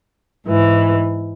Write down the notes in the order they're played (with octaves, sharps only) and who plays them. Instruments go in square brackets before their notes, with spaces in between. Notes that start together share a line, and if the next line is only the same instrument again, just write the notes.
[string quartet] G#2 E3